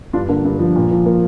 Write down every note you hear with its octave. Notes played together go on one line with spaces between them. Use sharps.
G2 D4 F4
D3 A#3 D4
G2
F3
A#2
F3
F3 A#3